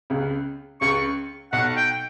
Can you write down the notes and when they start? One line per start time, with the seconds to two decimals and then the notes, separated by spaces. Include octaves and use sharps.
0.10 C#2 C#3
0.81 C#2 C#3 C#6
1.52 B1 B2 F#5
1.77 G5